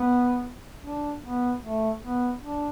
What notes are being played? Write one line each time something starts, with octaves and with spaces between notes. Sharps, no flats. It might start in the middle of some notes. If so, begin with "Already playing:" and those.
Already playing: B3
D4
B3
A3
B3
D4